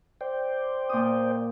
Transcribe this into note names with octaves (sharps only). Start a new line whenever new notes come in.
C5 D5 G5
A#2 D#6